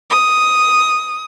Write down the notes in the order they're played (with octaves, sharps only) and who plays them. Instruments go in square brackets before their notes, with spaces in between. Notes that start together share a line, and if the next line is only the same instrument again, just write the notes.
[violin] D#6